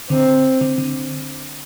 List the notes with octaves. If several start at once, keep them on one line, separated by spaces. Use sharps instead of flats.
D3 C4
D3
D3